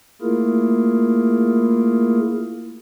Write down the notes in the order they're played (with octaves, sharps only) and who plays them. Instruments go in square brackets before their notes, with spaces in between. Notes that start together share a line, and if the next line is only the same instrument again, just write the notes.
[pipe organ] A3 A#3 E4 F4 G#4 A#4